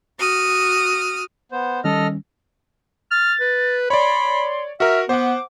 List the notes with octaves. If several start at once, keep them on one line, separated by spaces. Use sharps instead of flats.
F#4 D#6 F6
B3 C5
D#3 G3 C#4 A4 D#5 F6
F6 A6
B4
C#5 D5 B5 C6
F#4 A#4 E5 F6
B3 C5 F#5 D6